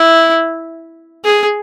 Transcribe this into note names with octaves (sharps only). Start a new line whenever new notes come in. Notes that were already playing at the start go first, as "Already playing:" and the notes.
Already playing: E4
G#4